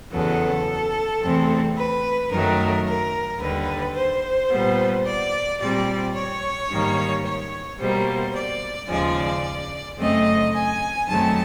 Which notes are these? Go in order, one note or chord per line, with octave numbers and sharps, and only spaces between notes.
E2 C#3 F#3 B3 A4
E2 C3 E3 A3 C4
B4
F#2 D#3 F#3 A3 A#4
A#4
D#2 D3 G3 B4
C5
A#2 G3 B3
D5
A#2 G3 C4 D5
C#5
G#2 D#3 G3 A#3
C#5
B2 G3 A#3 C5
D5
D#2 C#3 F3 G#3 D5
F#2 C#3 F#3 A3 C4 D#5
G#5
F#2 D#3 F#3 A3 C4 A5